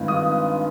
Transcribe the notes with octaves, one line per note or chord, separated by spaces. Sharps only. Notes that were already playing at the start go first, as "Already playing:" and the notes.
Already playing: G2 D#3 G#3 C4 F4
D#6